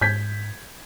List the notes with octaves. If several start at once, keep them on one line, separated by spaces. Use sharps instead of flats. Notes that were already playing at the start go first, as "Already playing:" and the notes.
G#2 G6 G#6 B6